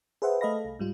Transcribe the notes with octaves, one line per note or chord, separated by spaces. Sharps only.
G#4 B4 C5 E5 F#5
A3 A4 D#5 F5 B5 A#6
C2
G#2 G3 F4